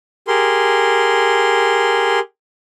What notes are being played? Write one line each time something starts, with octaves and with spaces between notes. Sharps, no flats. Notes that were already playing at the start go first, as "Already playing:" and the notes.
G4 G#4 A#4 C6